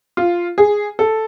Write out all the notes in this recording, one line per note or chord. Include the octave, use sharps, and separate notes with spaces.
F4
G#4
A4